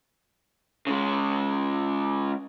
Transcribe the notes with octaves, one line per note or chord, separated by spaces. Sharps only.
C#3 G#3